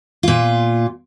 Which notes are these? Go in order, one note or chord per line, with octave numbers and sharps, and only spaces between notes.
A#2 F4